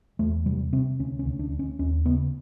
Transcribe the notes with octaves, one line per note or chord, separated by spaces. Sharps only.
E2 A3
C3 G3
C3 C4
D2 C#4
C#4
D2
D4
D2
C#4
D#2 C#4
C#3 B3